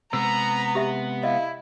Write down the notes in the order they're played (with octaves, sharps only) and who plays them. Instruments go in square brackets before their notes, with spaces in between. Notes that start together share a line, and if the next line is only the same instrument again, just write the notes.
[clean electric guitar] C3 G#3 [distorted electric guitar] B3 [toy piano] A#4 [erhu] A#5
[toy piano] G4 E5
[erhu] E4 [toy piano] D#5 F5